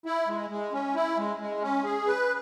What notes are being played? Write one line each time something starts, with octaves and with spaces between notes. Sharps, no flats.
E4
G#3
G#3
C#4
E4
G#3
G#3
C#4
G#4
B4